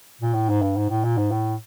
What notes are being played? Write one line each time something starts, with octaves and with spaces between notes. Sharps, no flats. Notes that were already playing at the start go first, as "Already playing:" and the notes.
A#2
A2
G#2
G2
G#2
A2
A#2
G#2
A2